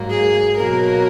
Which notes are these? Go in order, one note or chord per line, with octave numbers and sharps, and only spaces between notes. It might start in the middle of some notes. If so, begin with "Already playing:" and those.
Already playing: G#2 F#3 A#3
G#4
B2 F#3 A#3 A#4